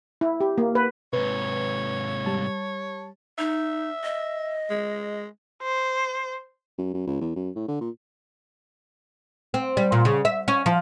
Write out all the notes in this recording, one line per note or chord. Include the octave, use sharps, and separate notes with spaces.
E4
G4
A#3
B4
G#2 C3 B4 C#5
G3 A5
D#4 E5
D#5
G#3
C5
F#2
F#2
C#2
E2
F#2
A2
D3
A#2
C4
G3
A#2
C#3
E5
C#4
F3